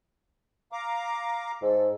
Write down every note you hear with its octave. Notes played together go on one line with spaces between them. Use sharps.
F5 A#5 D6
G#2 A4